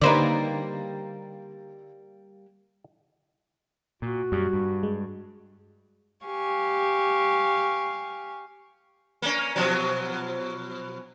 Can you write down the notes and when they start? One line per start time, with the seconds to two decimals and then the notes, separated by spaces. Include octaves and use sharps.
0.02 D3 G3 A#3 D#4 B4 C5 D5
4.02 A#2 F#4
4.32 F#2 G3
4.53 G2
4.83 G#3
6.25 G4 F5 G#5 C#6
9.22 A#3 C#4
9.56 B2 F3 F#3